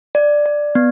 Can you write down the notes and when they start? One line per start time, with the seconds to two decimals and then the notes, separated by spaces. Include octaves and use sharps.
0.15 D5
0.46 D5
0.75 B3